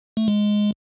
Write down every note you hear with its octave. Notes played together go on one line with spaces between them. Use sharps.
A3
G#3